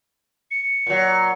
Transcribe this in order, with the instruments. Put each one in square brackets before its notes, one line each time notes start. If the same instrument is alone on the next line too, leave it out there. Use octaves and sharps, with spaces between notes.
[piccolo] C#7
[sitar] A#2 F#3